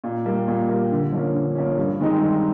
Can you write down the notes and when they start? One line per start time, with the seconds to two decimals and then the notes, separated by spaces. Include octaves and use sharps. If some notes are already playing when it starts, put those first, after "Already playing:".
0.04 A#2
0.25 G3 A#3
0.48 A#2
0.69 G3 A#3
0.91 D3
1.12 F3 A#3 C#4
1.34 D3
1.55 F3 A#3 C#4
1.77 G2
2.00 D#3 G#3 C4 D#4
2.20 G2